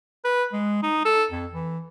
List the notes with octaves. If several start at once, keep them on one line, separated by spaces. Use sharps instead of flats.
B4
G#3
D#4
A4
F2
E3